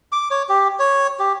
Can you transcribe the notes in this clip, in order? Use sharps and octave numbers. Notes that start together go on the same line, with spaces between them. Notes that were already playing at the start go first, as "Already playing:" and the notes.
D6
C#5
G4
C#5
G4